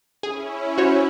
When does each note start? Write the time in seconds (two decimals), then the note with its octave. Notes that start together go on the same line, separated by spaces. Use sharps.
0.23 C#4 E4 G#4
0.78 F#4 C5 C#5